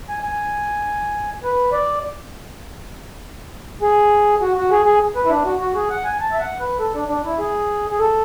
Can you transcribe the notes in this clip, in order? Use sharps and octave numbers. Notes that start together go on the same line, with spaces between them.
G#5
G#5
B4
D5
G#4
F#4
F#4
G#4
G#4
B4
E4
D4
F#4
F#4
G#4
F#5
G#5
A5
E5
F#5
B4
A4
D4
D4
E4
G#4
G#4
A4